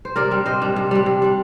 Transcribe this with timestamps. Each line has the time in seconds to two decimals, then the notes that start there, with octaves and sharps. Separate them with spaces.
0.05 C5
0.16 C3 A#4 D5
0.31 G3 D4
0.46 C3 C5 D#5
0.61 G3 D4
0.76 C3
0.91 G3 D4
1.06 C3
1.22 G3 D4